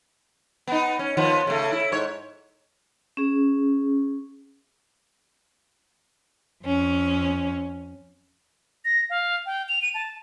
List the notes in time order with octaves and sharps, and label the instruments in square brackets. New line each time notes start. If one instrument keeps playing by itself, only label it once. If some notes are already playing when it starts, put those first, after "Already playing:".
[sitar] B3 D#4
C#4
D#3 F3 B3
C#3 A3
E4
G#2 C#5
[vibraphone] C#4 G#4
[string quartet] F2 C#4
[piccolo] A#6
F5
G5
F7
D#7
A5